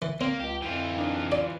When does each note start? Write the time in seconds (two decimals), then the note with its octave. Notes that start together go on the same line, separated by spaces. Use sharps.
0.02 E3
0.21 A#3 C4
0.40 C#2 G4
0.62 F2 E3 F4 G5
0.98 D4 D#4
1.32 D5